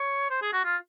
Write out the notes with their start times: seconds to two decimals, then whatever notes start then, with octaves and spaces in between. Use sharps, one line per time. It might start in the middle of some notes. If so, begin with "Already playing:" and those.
Already playing: C#5
0.30 C5
0.42 G#4
0.53 F#4
0.65 F4